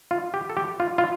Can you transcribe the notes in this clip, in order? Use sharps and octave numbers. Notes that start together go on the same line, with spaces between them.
F4
G4
A4
G4
F4
F4